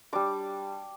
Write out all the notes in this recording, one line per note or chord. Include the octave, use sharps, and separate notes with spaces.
G3 D4 D6